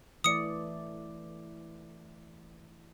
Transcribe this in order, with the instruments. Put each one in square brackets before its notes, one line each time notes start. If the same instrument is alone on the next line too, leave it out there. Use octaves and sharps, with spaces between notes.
[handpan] E3 A3 D5 [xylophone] D#6 C#7